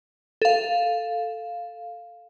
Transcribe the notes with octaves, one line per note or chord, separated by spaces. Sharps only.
A4 F5